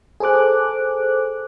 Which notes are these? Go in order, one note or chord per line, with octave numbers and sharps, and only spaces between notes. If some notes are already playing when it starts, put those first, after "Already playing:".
G#4 A4 C5 D6 F#6